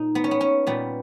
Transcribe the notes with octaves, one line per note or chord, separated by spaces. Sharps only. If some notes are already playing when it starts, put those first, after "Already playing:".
Already playing: A#2 D#4
B3
C#4
B3
C#4
A#2 G3 B3